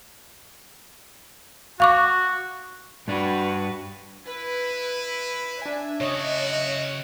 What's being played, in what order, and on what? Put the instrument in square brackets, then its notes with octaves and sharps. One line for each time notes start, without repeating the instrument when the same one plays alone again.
[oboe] F#4 [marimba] F5 C#6 D6
[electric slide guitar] G2 D4 [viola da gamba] F#4 B4
[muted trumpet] E4 [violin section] B4
[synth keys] D4 G#5 [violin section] E5
[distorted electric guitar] C#3 A5 [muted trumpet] F#4 [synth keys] C#5 D#5